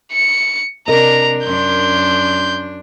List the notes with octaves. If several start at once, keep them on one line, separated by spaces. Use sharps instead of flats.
C#7
C3 D4 A#4 D#5 A#5
F#2 D4 C6 G6